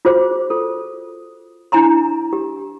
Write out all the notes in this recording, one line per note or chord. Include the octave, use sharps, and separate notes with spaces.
F4 F#4 G#4 C5 D6
F4 A4
D4 E4 G#5 A#5 C6
G4